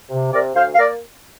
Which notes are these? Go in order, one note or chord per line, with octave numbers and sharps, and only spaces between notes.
C3
C3 A#4 D5
D2 C5 F5
F5
A#3 A#4 D5